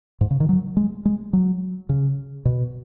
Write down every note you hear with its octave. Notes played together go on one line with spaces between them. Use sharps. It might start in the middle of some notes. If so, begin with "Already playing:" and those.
G#2
C#3
D#3
F#3
G#3
G#3
F#3
C#3
B2